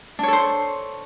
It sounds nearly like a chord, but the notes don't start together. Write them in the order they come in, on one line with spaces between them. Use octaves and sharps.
D4 C#5 A4 C5